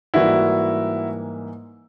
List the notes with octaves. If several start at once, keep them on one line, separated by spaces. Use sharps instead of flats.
G#2 E3 G3 A#3 E4 F#4